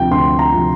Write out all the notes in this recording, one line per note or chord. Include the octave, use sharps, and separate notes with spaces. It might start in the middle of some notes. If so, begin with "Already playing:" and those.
Already playing: D2 C3 F3 G5
D2 C6
A#5
C3 F3